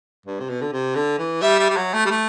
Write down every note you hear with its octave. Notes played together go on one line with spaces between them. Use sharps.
G2
C3
B2
D3
C3
D3
E3
G3 E5
G3
G3
F#3
A3
G3
A3